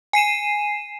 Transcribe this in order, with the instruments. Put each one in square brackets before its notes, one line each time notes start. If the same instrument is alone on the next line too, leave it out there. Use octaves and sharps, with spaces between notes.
[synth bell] G#5 C7 D#7 E7